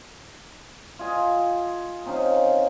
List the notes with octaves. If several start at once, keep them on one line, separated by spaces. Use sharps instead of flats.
F4 G#4 D#5
C3 C#4 D#4 F5